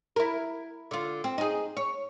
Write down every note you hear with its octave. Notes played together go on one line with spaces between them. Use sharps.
E4 A#4
D3 F4
C4
D#4 G#4
C#5